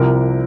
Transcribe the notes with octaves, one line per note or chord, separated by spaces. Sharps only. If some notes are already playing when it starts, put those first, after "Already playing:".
Already playing: C2 C3 F3 A#4